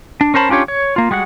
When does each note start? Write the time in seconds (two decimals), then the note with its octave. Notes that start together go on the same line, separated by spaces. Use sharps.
0.21 D4
0.34 C#4 A#4 C5 A5 B5
0.49 C#4 D4 F4 G4 C#5
0.68 C#5
0.96 A#3 F4
1.11 G3 G#3 F#4 F#5